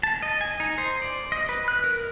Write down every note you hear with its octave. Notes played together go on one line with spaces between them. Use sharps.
A5
D#5
G#5
D#4
C5
D5
D#5
B4
F#6
A#4